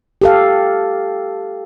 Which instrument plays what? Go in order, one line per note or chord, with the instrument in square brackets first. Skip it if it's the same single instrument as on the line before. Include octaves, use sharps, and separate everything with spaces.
[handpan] G4 A4 F5